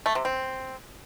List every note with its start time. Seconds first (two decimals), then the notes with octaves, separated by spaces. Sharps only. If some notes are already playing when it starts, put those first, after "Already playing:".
0.06 A3
0.15 C3
0.25 C4